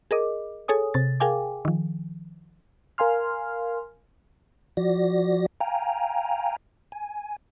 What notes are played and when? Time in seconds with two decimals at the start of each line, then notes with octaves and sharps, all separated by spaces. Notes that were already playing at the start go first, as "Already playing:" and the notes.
0.11 G#4 A#4 D#5 D6
0.68 G#4 A4 C#5 G#5 D#6
0.94 C3 A6
1.20 G#4 A#4 F5 G5 G#5 D6
1.65 D#3 F3
2.98 A#4 F5 G#5 C6 F6
4.77 F3 F#4 D5 A#6
5.61 F5 G5 G#5 A#5
6.92 G#5